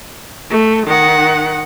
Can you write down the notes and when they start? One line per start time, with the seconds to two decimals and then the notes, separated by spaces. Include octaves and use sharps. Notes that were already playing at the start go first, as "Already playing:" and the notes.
0.50 A3
0.87 D#3 F#5